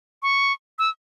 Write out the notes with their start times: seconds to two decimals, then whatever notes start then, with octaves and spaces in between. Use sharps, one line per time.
0.22 C#6
0.79 E6